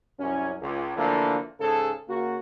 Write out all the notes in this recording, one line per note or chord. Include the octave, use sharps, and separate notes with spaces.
C2 F#2 C#4
C#2
D3 E3 F3 A3 A#3
G#2 C#3 G#4 A4
C#3 A#3 F#4